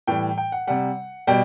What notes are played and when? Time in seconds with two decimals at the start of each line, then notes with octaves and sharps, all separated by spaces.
0.07 A2 E3 G3 G5
0.38 G5
0.52 F#5
0.67 C3 G3 F#5
1.27 B2 G3 G5